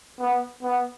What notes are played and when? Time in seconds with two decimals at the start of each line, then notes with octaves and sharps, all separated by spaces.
0.20 B3
0.63 B3